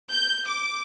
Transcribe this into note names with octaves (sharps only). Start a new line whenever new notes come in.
G6
D6